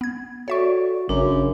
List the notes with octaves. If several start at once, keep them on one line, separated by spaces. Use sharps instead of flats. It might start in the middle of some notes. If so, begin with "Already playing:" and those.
B3 G#6
F#4 A4 C#5 D5 E5 C#6
G#1 F#2 C#3 D4